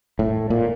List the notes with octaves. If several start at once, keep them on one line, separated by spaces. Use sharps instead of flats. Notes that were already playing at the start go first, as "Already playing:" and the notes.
A2
A#2